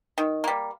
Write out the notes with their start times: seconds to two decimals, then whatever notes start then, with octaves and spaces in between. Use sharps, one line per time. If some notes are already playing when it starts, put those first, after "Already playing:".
0.18 D#3
0.44 G3 A#3